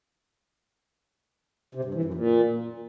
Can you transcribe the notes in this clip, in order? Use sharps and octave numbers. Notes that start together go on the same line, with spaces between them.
C3
G2
E3
F#2
A#2